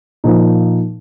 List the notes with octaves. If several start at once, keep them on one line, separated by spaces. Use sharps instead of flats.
A#2 F3 A#3 D#4